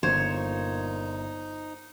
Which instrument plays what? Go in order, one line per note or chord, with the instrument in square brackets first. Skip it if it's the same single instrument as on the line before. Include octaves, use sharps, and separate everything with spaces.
[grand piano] G1 [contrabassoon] A#2 [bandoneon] D#4 [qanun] C5 C#5